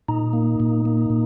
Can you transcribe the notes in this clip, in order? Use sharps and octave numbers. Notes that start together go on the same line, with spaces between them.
A#2 D#4
A#3
A#2
A#3
A#2